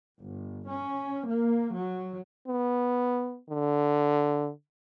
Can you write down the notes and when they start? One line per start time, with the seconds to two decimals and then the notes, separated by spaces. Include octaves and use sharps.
0.19 G1
0.68 C#4
1.28 A#3
1.76 F#3
2.48 B3
3.49 D3